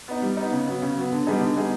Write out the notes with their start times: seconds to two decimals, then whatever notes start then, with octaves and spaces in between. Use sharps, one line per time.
0.08 B3 D#4
0.22 G3
0.37 B3 D#4
0.52 C#3
0.67 F#3 B3
0.82 C#3
0.96 F#3 B3
1.12 D3
1.27 G3 B3 D#4 G#4
1.41 D3
1.56 G3 B3 D#4 G#4